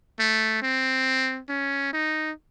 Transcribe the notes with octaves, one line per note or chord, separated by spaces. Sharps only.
A3
C4
C#4
D#4